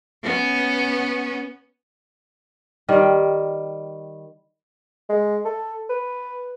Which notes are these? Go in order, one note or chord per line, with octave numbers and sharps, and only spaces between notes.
B3 C#4
D#3 G3
G#3
A4
B4